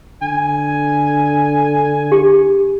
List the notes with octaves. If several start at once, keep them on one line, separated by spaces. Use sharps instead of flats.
D3 G#5
G4